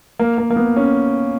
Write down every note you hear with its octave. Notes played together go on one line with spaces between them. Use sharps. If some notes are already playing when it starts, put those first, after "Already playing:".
A#3
A#3
A#3
B3
C#4